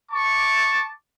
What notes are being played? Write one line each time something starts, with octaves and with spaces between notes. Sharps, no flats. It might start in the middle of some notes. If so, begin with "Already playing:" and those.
A5 C#6 D6